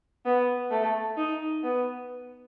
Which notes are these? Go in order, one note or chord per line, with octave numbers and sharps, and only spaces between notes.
B3
A3
D#4
B3